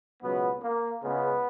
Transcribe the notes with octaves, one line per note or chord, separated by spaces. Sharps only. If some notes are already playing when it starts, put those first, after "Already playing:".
C#2 B2 F#3 B3
A#3
C#2 C#3 G#3 B3